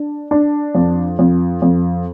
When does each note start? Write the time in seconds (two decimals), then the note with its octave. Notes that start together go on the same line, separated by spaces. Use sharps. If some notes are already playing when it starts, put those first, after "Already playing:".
Already playing: D4
0.31 D4
0.75 F2
1.19 F2
1.62 F2